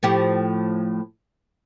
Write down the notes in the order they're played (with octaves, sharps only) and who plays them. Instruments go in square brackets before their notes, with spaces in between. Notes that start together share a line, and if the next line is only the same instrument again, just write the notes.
[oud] A2 F3 G4